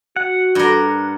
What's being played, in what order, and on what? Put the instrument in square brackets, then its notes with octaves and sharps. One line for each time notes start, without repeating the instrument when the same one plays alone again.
[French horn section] F#4 [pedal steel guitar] F#5
[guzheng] G2 A#4